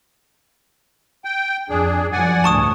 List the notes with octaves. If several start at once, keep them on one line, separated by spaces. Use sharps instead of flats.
G5
F2 D4 G#4
F#2 F3 D5 F#5 G#5
G1 D2 A2 A5 C#6 D#6